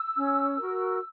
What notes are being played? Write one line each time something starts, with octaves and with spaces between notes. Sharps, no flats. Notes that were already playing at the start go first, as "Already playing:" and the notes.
Already playing: E6
C#4
F#4 A#4